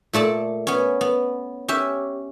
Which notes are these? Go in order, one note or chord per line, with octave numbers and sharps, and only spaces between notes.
A#2 A3 D5 A5
B3 C#4
B3
C#4 G4 E5